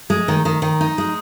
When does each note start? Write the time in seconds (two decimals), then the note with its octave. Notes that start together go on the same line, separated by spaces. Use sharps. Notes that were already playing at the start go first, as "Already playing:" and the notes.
0.10 G#3
0.28 D#3
0.45 D#3
0.62 D#3
0.81 D#4
0.98 G#3